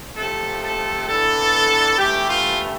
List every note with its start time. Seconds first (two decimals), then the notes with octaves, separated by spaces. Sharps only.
0.17 C3 F3 A3 A4
0.63 A4
1.07 E3 B3 D4 A4
1.98 G2 E3 A3 G4
2.28 F4